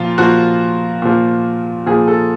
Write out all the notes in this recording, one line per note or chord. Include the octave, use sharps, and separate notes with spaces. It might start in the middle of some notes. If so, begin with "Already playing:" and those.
Already playing: A#2 F3 F4
A#2 F3 F#4
A#2 F3
A#2 F3 G#4
A4